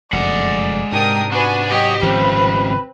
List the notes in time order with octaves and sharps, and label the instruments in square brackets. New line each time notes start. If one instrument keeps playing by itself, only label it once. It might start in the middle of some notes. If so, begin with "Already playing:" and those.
[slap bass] F1 F#2 D3 [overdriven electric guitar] G#3 F#5 [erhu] D5
[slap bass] G#2 C3 [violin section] D4 A#4 D#6 [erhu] G5
[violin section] B3 G#5 [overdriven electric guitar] D4 [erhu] F#4
[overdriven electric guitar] F#4 C#5 [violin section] G4 [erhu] D#5
[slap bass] G#1 F3 [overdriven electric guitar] C#3 G3 [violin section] C4 [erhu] B4